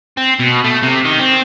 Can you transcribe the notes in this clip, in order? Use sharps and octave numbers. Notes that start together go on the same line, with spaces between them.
C4
B2
A3
C3
D#3
C4